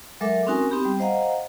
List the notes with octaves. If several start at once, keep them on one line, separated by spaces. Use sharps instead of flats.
F#3 G#3 A4 A#4 E5 D6
C4 C#4 D#4 F#4 A#4 G#5
B3 C4 D#4 G4 B5
G3
C5 D#5 F5 F#5 A#5